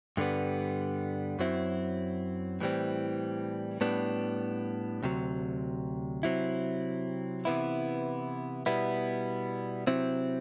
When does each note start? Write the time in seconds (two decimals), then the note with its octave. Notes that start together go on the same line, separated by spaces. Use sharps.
0.17 G2 D3 G3 B3
1.39 F#2 F#3 C4 E4
2.61 A2 E3 G3 C4
3.81 A2 G3 B3 D4
5.03 D2 C3 F#3
6.23 C3 F#3 C4 E4
7.45 C3 E3 B3 E4
8.66 B2 G3 B3 E4
9.87 C3 F#3 C4 E4